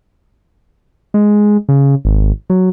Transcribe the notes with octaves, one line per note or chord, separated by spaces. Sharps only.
G#3
C#3
G#1
F#3